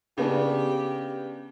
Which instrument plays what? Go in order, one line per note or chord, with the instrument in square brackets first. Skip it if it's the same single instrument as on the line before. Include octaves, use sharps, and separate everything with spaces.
[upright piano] C#3 B3 D4 [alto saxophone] G4